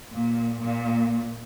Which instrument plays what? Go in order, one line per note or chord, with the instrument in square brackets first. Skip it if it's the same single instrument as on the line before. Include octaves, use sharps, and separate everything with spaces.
[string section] A#2
A#2